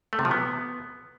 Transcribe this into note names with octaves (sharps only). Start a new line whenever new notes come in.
A3
C3
F3
B3